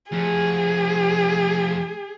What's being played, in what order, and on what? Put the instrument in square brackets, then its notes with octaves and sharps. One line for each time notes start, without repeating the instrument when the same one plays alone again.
[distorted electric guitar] F3 A3 [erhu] G#4